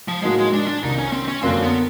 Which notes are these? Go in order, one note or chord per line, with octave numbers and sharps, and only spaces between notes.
F3
A2 F#3 G#3 A#3 D#4 F#4
G#3
D4
D4
C2 C3 D#3 D#4
C#4
C4
C#4
F#2 D3 F#3 A#3 C4
B3